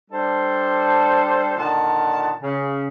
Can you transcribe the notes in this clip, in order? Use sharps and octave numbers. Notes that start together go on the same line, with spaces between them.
G3 D4 A4 C5
A#2 D3 D#3 F#5 A5
C#3